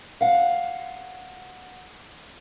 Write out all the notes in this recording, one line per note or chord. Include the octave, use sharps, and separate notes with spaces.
F5 F#5